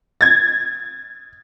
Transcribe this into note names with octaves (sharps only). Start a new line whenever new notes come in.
G#6 A6